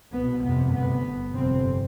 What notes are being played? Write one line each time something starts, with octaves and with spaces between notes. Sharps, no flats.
C2 B2 B3
G1 F2 C3 B3
D2 C3 B3
G1 G2
G1 F2 C3 C4